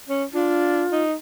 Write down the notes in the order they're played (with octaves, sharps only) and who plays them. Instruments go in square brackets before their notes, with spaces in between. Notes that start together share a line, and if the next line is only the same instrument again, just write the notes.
[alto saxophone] C#4
[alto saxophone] D4 [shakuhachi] F4
[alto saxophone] D#4